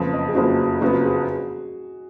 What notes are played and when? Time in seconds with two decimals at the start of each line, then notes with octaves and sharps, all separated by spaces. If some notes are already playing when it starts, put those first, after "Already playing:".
Already playing: F#1 F2 F3 B3 F5
0.13 D#5
0.28 G#4
0.35 F#1 F2 F3 B3 F#4
0.59 F4
0.81 F#1 F2 F3 B3 F#4
1.05 G#4